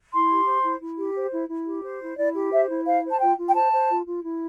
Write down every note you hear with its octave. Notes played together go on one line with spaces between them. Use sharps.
E4 C6
G4
C5
E4
E4
G4
C5
E4
E4
G4
C5
E4
E4 D5
G4
C5 E5
E4
C5 F5
C5
A5
F4 G5
F4
G5
C5 A5
C5
F4
F4
E4